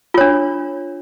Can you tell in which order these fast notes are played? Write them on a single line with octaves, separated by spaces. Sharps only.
F4 C#5 D4